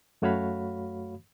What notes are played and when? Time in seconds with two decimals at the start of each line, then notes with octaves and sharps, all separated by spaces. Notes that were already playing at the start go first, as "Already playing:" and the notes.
0.22 F#2 A3 F#4 C#5 F5 B5